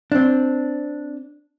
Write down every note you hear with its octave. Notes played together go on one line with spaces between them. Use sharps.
C4 D4